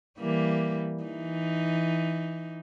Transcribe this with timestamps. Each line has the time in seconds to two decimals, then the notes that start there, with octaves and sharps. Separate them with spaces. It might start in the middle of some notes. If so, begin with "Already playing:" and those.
0.19 E3 G3 A#3
1.03 E3 D#4